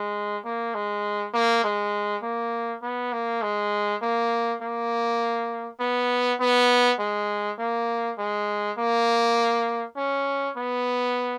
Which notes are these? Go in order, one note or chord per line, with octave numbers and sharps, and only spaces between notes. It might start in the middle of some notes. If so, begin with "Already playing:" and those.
Already playing: G#3
A#3
G#3
A#3
G#3
A#3
B3
A#3
G#3
A#3
A#3
B3
B3
G#3
A#3
G#3
A#3
C#4
B3